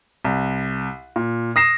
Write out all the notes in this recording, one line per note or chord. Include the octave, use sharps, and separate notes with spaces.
C2
A#2
D#6 A#6 C7 E7